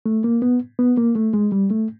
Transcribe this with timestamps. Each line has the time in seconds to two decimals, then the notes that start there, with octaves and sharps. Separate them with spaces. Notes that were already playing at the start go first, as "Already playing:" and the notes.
0.06 A3
0.24 A#3
0.42 B3
0.79 B3
0.97 A#3
1.16 A3
1.34 G#3
1.52 G3
1.71 A3